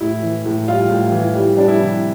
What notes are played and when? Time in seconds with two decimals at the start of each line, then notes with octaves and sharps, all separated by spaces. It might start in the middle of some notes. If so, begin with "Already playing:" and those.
0.01 A2 E4
0.23 E3
0.46 A2
0.68 G3 F4
0.89 A2
1.12 E3
1.35 G3
1.56 G3 D4
1.68 E4
1.79 C3